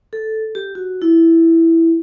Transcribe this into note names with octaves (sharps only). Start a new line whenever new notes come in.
A4
G4
F#4
E4